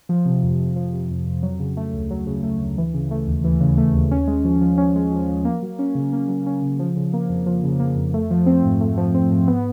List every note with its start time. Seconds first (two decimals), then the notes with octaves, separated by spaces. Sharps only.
0.09 F3
0.25 C3
0.43 F2
0.59 F2
0.76 F3
0.93 C3
1.10 F2
1.27 F2
1.43 F#3
1.60 C#3
1.77 A3
1.94 D2
2.11 F#3
2.27 C#3
2.43 A3
2.60 D2
2.78 E3
2.94 C#3
3.11 A3
3.27 D#2
3.44 E3
3.60 C#3
3.78 A3
3.94 D#2
4.11 C#4
4.27 G#3
4.45 F3
4.61 F3
4.78 C#4
4.96 G#3
5.12 F3
5.28 F3
5.45 A#3
5.62 F#3
5.79 C#4
5.95 C#3
6.13 A#3
6.28 F#3
6.46 C#4
6.62 C#3
6.79 F3
6.97 C#3
7.13 A#3
7.29 F2
7.46 F3
7.63 C#3
7.80 A#3
7.96 F2
8.14 A3
8.31 F3
8.46 C4
8.63 G#2
8.81 A3
8.97 F3
9.14 C4
9.30 G#2
9.48 B3